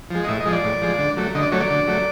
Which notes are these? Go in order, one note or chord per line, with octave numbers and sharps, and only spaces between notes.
F3 G#3
D#5
A2 E5
D#5
F3 G#3
D5
A2
F3 G#3
D3
F#3 A3
D3 D#5
D5
F#3 A3 C#5
D5
D3
F#3 A3